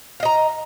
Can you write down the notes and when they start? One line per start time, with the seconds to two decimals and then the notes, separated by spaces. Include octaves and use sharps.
0.20 F5
0.23 D#5
0.25 A#5